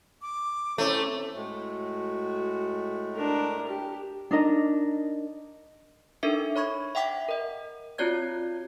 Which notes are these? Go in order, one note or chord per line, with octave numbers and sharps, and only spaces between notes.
D6
A3 C4 C#4 E4 C#5 A#5
A2 G#3 A3 F#4
D4 A#4
G4
D4 D#4 A#4 D#5
D4 D#4 A4 A#4 E5 C#7
C#5 B5 C#6 G#6
E5 F#5 G5 D6 B6
A#4 D#5
C4 F4 F#4 C#5 D5 G#6